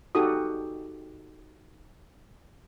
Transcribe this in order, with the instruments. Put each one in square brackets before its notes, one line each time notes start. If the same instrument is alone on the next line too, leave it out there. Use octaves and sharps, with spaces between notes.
[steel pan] D#4 F#4 G4 A4 D#6